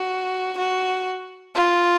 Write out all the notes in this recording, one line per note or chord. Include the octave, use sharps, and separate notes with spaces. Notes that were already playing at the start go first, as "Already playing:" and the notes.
Already playing: F#4
F#4
F4